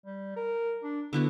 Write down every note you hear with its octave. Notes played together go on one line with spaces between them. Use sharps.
G3
A#4
D4
D3 B3 E4 F#4